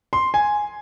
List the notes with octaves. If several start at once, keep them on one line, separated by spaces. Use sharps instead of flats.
C6
G#5